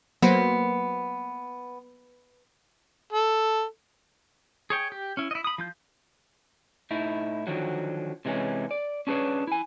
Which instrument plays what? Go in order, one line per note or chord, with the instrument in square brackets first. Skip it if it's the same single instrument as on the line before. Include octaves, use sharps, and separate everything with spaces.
[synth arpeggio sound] F#3 A#3 C5 [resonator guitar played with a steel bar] B3
[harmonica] A4
[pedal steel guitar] G#4 C#5 G5
G4
C#4 E4
E4 D#5
B5 D#6
F3 F4 G6
[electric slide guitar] A2 D#4 E4
D3 D#3 F3 F#3 F#4
C3 E3 G#3 C4 C#4
D5
C#4 D4 G#4 B4 C#5
E4 G#5